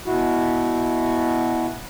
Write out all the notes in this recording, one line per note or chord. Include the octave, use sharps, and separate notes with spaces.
B2 E4 F#4